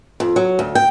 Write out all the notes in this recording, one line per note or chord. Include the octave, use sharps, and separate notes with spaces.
F2
F#3
D2
G5